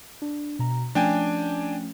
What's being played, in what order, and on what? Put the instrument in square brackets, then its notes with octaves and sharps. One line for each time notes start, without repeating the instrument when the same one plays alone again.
[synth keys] D4
B2 A#5
[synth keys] F3 A3 C#4 [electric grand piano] D4 G5 G#5